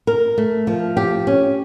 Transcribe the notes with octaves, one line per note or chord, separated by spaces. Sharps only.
A#4
A3
F3
G4
C#4